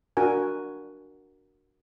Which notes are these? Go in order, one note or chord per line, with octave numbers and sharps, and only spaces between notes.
D4 F#4 A#4 G#5